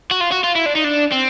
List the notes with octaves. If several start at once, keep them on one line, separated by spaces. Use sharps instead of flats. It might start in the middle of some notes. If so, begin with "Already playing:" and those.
F#4
F4
F#4
F4
E4
D4
D#4
D4
C4